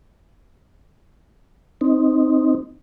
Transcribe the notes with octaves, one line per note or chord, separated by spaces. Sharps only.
C4 D#4